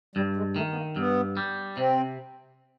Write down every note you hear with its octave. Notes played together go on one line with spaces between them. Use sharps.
G2 G3
G#3
D#3 A3
B3
A#3
G2 B3
G3
C3 C4